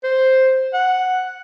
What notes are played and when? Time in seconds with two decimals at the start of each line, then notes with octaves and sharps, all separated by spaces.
0.03 C5
0.74 F#5